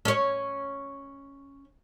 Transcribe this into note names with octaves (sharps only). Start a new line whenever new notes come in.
C#4 C#5